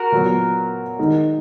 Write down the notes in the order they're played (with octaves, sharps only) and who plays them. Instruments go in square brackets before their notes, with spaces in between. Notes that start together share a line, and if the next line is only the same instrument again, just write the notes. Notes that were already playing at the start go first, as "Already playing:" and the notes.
Already playing: [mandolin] F#4 A#4
[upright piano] A#2 F#3 B3
D#3 G#3 D#4